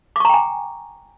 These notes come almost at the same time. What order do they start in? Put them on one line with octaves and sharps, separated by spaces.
D6 C#6 A#5 G5 G#5